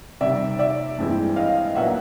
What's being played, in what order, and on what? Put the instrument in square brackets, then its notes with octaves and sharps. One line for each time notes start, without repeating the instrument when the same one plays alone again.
[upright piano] C3 D#3 G3 D5 E5
D5 E5
G2 E3 G#3 C4 E4
D#5 F5
A#2 F#3 B3 D4 E5 F#5